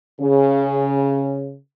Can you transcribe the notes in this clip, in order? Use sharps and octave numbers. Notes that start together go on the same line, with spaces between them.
C#3